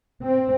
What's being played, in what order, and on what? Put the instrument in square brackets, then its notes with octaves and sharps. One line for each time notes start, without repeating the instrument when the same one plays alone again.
[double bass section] C4